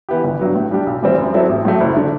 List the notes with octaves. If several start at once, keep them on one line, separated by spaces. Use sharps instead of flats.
E3 B3 E4 G4
G1
G2 F#3 B3
A2
G3 D4 G4
B1
A2 E3 G3 C4
F#2
F#3 C4 E4 A4
A1
A2 F#3 A3
F#1
D3